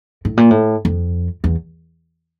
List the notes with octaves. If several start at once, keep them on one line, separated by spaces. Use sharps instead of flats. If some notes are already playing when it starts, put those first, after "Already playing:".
A2
A#2
A2
F2
E2